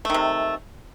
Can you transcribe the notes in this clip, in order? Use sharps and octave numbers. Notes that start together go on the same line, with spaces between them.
C3 D#3 A3